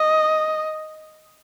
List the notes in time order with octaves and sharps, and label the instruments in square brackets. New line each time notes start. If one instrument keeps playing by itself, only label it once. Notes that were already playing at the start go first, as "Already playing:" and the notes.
Already playing: [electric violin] D#5